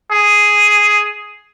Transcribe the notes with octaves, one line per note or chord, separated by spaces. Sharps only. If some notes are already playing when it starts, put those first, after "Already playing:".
G#4